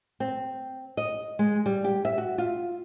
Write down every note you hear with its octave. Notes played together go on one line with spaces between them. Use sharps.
C4
D#5
G#3
G3
G4
E5
F#4
F4